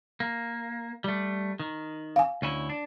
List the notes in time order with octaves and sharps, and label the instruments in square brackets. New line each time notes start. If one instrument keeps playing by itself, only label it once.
[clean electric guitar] A#3
G3 A3
D#3
[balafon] F5 G#5
[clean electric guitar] D2 C#4 E4
D4